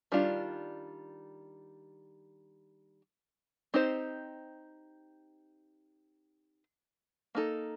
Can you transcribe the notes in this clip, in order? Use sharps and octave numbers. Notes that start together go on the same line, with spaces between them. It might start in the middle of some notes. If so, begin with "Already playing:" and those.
D#3 G3 D4 F4
C4 D#4 G4 C5
A#3 D#4 A4